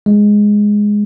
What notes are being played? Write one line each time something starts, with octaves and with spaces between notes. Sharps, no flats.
G#3